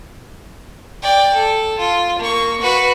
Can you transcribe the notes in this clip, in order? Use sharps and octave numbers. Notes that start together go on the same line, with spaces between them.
D5 G5
A4
F4
A#3 C#6
F#4 B4